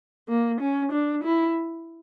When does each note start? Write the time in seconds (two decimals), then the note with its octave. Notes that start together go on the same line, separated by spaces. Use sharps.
0.29 A#3
0.61 C#4
0.92 D4
1.24 E4